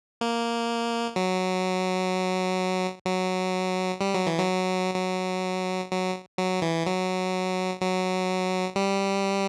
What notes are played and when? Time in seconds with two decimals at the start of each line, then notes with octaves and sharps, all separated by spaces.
0.21 A#3
1.16 F#3
3.06 F#3
4.01 G3
4.14 F#3
4.27 E3
4.39 F#3
4.95 F#3
5.91 F#3
6.38 F#3
6.62 E3
6.86 F#3
7.80 F#3
8.76 G3